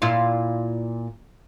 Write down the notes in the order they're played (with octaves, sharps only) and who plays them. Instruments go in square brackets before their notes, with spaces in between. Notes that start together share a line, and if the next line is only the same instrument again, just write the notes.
[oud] A#2 E4 F4